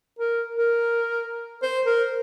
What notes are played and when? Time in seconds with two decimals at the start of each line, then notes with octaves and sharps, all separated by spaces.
0.19 A#4
0.55 A#4
1.63 C5
1.86 A#4